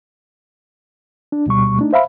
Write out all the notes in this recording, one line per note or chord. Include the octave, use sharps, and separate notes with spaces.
D4
D2 B2 G3 C#6
A3 D4 D#4
C5 E5 F5 B5